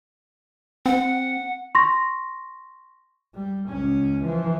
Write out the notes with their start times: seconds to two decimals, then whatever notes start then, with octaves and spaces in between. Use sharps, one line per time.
0.86 C4 F#5
1.75 C6 C#6 A#6
3.34 G3
3.69 C#2 C#4
4.23 E3 F3